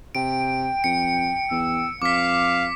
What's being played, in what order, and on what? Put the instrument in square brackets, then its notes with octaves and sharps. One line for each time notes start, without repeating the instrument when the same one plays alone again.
[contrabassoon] C3 [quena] G5 [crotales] D7
[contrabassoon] F2 [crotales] C#7
[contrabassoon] E2 [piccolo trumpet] E6
[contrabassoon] F2 [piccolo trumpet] F5 [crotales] D6 B6